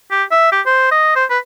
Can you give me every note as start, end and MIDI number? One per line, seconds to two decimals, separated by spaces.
0.11 0.23 67
0.31 0.52 76
0.52 0.61 67
0.66 0.87 72
0.91 1.15 75
1.16 1.25 72
1.30 1.39 71